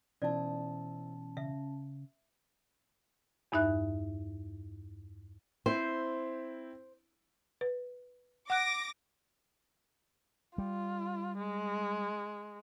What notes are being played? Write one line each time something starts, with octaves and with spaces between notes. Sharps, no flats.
B2 E3 C#4 D#4 E4 C5 D5 A5
C#3 E5
E2 G2 D#4 E5 F#6
C4 E4 C5
B4
F#5 D6 F#6 A#6
G3 F4
G#3